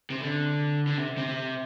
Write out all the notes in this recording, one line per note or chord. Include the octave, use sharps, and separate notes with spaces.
C3
D3
D3
C3
C3